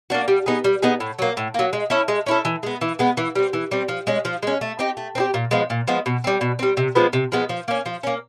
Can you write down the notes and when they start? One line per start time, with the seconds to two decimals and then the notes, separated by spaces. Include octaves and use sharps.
0.10 A#3 D4 F#4
0.28 G3
0.46 B3 D#4 G#4
0.64 G3
0.82 B3 D#4 G#4
1.00 A2
1.19 F#3 A#3
1.37 A2
1.54 F#3 A#3
1.73 G#3
1.90 C#4 E4 A4
2.08 G#3
2.26 C#4 E4 A4
2.45 E3
2.63 G#3 B3
2.81 E3
2.99 G#3 B3
3.17 E3
3.35 G3 C4
3.53 E3
3.71 G3 C4
3.88 F3
4.07 G#3 C#4
4.25 F3
4.43 G#3 C#4
4.61 A3
4.79 C4 D#4 G4
4.97 A3
5.15 C4 D#4 G4
5.34 A#2
5.51 F3 G#3 B3
5.70 A#2
5.88 F3 G#3 B3
6.06 B2
6.24 G3 C4
6.41 B2
6.59 G3 C4
6.77 C3
6.95 F3 G#3 B3
7.13 C3
7.32 F3 G#3 B3
7.49 F3
7.68 A#3 C#4
7.86 F3
8.03 A#3 C#4